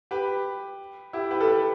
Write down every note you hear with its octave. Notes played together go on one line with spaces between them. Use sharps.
G4 B4
E4 G4
G4 B4
A4
G4 B4